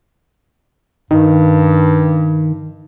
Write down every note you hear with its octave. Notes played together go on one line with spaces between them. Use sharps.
G2 D#3